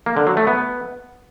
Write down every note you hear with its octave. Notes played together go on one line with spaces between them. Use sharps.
A#3
D3
F#3
A3
B3